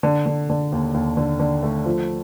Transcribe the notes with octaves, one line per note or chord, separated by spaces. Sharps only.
D3
D3
D3
D#2
D#2
D3
D3
A3
F3